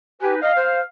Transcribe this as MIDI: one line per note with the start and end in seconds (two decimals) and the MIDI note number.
0.22 0.41 63
0.22 0.35 67
0.22 0.41 71
0.22 0.41 80
0.42 0.52 75
0.42 0.81 77
0.56 0.80 72